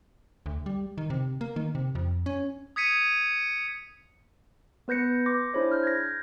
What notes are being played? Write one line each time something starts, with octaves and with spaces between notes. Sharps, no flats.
D2
G3
D#3
C3
A#3
D#3
C3
F2
C#4
D#6 G#6 B6 C#7 D#7
B3 B4 G6 A#6 C#7
C6 D6 A#6
D4 E4 G#4 C5 C#5
F6 G6
G#6 A#6